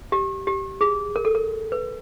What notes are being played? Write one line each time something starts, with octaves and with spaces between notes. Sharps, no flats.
G4
G4
G#4
A#4
A4
A#4
B4